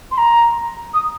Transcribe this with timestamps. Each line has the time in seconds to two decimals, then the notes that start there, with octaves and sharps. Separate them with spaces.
0.11 C6
0.17 A#5
0.93 D#6